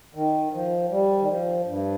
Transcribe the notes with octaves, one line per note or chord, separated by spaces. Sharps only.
D#3
F3
G3
D#3
F3
G2